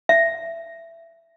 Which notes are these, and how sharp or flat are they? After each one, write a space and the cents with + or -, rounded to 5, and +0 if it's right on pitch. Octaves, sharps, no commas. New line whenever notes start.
E5 +15